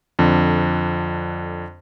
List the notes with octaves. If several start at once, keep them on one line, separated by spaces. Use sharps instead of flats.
F2 D3